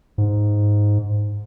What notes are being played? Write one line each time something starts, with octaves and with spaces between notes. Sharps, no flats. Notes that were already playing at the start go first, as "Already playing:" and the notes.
G#2